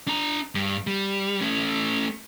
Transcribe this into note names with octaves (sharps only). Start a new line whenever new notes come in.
D4 A#5
G2
G3
A3 C#4